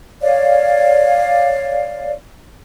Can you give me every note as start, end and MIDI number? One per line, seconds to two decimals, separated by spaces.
0.22 2.13 73
0.22 2.13 74
0.22 2.13 77